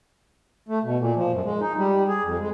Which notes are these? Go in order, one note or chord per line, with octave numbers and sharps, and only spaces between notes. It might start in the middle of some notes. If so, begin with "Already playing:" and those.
A3
B2
A#2
F3
F#2
G#3
D#4
G3
G#4
F2
G#3